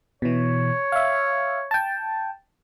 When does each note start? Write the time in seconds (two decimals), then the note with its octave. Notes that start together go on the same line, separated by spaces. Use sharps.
0.22 B2 E3 C#5
0.92 E5 F5
1.71 G5 A5